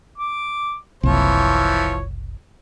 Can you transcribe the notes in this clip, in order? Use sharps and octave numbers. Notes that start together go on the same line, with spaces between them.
D6
F#1 C2 E3 F3 C#5